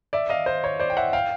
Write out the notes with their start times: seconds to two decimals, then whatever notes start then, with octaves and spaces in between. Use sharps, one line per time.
0.13 D5 E5
0.29 D#5 F5
0.46 C5
0.64 C#5
0.80 C5 D5
0.90 G5
0.97 E5 F#5
1.13 F5 G5